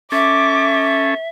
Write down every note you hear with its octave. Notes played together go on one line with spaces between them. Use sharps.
C#4 A4 E5 D6